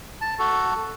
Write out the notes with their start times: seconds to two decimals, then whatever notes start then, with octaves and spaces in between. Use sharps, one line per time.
0.21 A5
0.39 F#4 A4